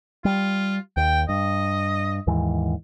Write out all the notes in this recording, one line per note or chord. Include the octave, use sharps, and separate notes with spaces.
G3 F4
D#2 G5
G2 D#5
D#2 G#2 E3